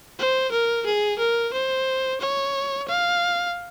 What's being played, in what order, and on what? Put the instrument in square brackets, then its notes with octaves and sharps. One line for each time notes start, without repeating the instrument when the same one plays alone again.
[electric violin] C5
A#4
G#4
A#4
C5
C#5
F5